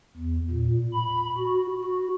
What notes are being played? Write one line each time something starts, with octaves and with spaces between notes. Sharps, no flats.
E2
A#2
B5
F#4
F#4